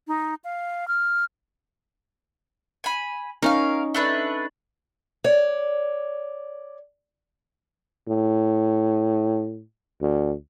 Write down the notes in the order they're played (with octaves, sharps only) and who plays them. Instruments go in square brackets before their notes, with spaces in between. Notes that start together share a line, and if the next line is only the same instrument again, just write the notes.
[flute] D#4
F5
F6
[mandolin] G#5 B5
[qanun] C#4 D#4 [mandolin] A#4 F5
[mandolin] A3 D4 B4
[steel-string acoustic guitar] C#5 D5
[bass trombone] A2
D2